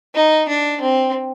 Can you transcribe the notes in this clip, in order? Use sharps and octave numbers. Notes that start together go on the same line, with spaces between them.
D#4
D4
C4